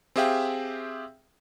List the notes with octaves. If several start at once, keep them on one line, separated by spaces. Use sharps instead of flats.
C4 G4 G#4 E5 F5 G5